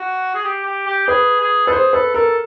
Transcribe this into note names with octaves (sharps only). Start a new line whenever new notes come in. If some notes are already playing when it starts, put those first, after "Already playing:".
Already playing: F#4
G#4
G4
G4
G4
G#4 B4
G#4
A4 B4
G#4 C5
A4 B4
A4 A#4